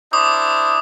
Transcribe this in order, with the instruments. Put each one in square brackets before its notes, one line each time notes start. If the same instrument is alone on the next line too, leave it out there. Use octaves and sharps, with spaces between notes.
[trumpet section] D4 E4 C5 [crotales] D6 D#6